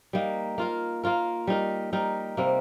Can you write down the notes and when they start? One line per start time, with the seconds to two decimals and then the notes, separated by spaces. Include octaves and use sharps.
0.13 G3 A#3 D#4
0.58 A#3 F4 A#4
1.04 A#3 F4 A#4
1.47 G3 D#4 A#4
1.93 G3 D#4 A#4
2.37 C3 G3 A#3